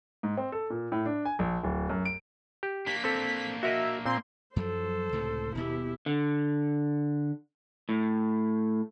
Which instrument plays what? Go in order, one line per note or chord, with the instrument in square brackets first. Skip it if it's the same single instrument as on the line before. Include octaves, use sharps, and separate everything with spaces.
[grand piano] G#2
C4
A4
A#2
A2
D4
G#5
A#1
D1
F#2
D7
[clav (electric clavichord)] G4
[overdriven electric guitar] A#3 D4 [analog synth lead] B6
[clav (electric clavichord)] C4 A4
[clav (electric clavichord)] F#4 A#4 D#5 [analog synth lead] E5
[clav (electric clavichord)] A#2 C4 [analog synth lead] C6
[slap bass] F#2 F3 F#3 [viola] A4 C5
[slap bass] C#2 A2 C3
[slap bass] D#1 B2 B3 [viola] E4 G4
[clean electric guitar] D3
A2